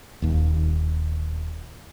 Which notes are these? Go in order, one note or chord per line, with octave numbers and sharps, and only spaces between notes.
D#1 D#2